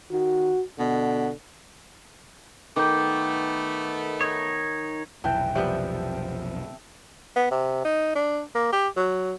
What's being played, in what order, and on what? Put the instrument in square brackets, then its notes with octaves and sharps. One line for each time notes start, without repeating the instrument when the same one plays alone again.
[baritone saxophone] D#3 [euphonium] F#4
[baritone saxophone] B2 [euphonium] D3
[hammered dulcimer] D#3 [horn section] A3 B3 [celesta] D6 G6
[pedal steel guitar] D#4 C#5 [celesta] D#6
[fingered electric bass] F1 B1 [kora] E3 [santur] G5 A5
[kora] C3 G3 B3 [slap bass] F3 [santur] E5
[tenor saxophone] B3
C3
D#4
D4
A#3
G4
F#3